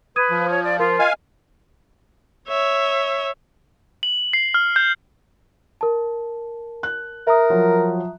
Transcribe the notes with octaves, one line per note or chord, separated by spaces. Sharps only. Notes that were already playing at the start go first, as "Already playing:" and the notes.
B4 D#6 G#6 D#7
F3
C#5
D5
F4 A#4
D#5 F5 G#5
C#5 E5
F#7
C7
F6
G6
A#4 A5
F#6
A#4 E5 A#5 D#6
F3 F#3